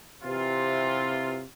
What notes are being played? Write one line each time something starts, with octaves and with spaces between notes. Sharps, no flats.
C3 E3 F4